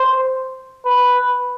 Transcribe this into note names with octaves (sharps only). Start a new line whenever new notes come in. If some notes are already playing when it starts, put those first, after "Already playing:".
Already playing: C5
B4